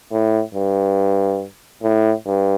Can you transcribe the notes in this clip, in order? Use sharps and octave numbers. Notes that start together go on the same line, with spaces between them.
A2
G2
A2
G2